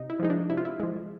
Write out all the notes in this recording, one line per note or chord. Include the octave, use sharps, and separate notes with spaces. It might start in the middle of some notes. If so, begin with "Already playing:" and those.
Already playing: C3 D#4
E4
F3 G#3 D#4
D4
C3 E4
F4
E4
F3 G#3